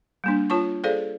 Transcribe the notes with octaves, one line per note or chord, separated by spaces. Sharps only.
G3 A#3 D4
F4 C#5 A5 C#6
G#4 A4 C5 D5 F5